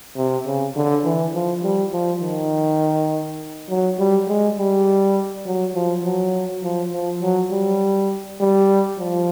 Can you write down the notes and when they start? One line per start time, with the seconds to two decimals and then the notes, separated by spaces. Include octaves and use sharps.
0.16 C3
0.46 C#3
0.76 D3
1.04 E3
1.34 F3
1.63 G3
1.93 F3
2.22 D#3
3.69 F#3
3.99 G3
4.28 G#3
4.58 G3
5.46 F#3
5.75 F3
6.04 F#3
6.63 F3
6.93 F3
7.22 F#3
7.51 G3
8.40 G3
8.99 F3